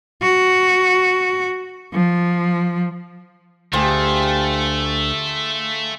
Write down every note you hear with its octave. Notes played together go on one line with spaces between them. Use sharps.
F#4
F3
D2 A3 F4 G4 G#4